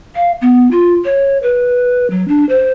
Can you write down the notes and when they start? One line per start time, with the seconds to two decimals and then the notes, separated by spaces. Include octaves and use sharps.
0.15 F5
0.41 B3
0.71 F4
1.04 C#5
1.43 B4
2.10 F#3
2.28 D4
2.49 C5